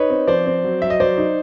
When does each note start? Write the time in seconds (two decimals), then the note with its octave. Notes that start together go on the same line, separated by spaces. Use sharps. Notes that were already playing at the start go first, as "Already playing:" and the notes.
Already playing: D#4 B4 C#5
0.10 C4
0.27 F3 C5 D5
0.46 C4
0.64 F#3
0.82 F#3 E5
0.90 D#5
1.00 F#3 C5 D5
1.18 D#4